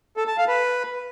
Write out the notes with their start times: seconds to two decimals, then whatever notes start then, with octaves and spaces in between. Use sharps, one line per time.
0.17 A4
0.27 A5
0.38 F5
0.48 B4